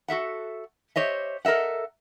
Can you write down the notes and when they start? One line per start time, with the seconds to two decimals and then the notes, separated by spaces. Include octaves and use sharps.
0.08 F#4 A4 E5 F#5
0.96 G4 C5 C#5 D#5 E5
1.45 A4 A#4 D#5 E5 F#5